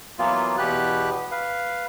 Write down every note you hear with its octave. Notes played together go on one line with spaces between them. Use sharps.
E3 F#3 A#3 B3 F4
E2 B2 B3 G4 B4 F#6
B4 F5